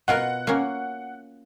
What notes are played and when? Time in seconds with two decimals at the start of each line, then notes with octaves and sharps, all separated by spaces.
0.08 B2 F4 A#4 F#5
0.47 A#3 C#4